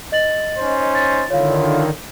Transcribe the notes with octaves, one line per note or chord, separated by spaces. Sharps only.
D#5 A6 F#7
C#4 D#4 C5
A6
D3 D#3 E4 F4 C#5 F5